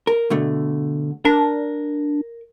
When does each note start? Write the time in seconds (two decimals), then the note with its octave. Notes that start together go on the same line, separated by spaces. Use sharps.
0.07 A#4
0.30 B2 D3 A3
1.25 D4 A#4